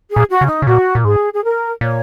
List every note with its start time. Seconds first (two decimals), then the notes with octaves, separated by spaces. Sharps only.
0.10 G#4
0.16 A#2
0.29 F#4
0.41 C#3
0.48 D#4
0.62 C#3
0.67 A#2 F#4
0.95 A#2
1.05 G#2 G#4
1.33 G#4
1.43 A#4
1.81 A#2 C#5